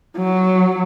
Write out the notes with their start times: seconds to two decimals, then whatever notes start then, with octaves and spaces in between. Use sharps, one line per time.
0.17 F#3